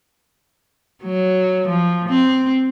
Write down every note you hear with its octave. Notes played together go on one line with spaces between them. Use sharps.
F#3
F3
C4